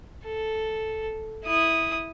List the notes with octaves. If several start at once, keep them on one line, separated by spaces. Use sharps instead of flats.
A4
E4 D#6